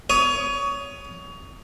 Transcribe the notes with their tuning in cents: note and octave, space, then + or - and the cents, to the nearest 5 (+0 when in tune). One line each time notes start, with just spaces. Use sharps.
C#5 +25 D#6 +0